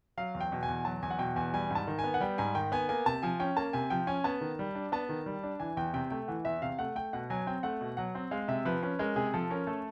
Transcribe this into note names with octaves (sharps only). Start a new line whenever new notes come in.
F#3 F5
E2
G5
B2
G#5
E2
F#3 A5
E2 G#5
F#5
B2 G5
E2 G#5
G3 G#5
G#2 A5
D#3
G#5
B3
F#5
G3 G5
G#2 G#5
D#3 G5
B3 G#5
A#3 G#5
C3 A5
F3 G#5
C#4 G5
A#3 A5
C3 G#5
F3 G5
C#4 G#5
B3 A5
D#3
G3
D4
B3 A5
D#3
G3
D4
E3 G#5
E2 G5
C3 G5
A3 G5
E3 F#5
E2 E5
C3 F5
A3 F#5
A3 G5
B2 F#5
F#3 G#5
C4 G5
A3 F#5
B2
F#3 F#5
C4
G#3 F5
C3 E5
F3 B4
C#4 B4
G#3 A#4
C3 G#4
F3 A4
C#4 A#4
A3 A4